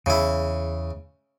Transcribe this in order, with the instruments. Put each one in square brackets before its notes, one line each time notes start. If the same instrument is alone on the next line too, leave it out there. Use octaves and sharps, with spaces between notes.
[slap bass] E2 [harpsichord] C#3 E4